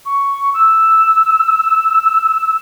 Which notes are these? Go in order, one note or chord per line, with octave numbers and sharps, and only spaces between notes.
C#6
E6